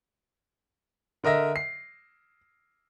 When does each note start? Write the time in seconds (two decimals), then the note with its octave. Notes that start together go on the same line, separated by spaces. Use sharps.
1.24 D3 A#4 D#5 E5 A#6
1.56 C7